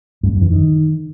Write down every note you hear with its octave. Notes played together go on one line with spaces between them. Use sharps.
G2
F#2
E3
D#3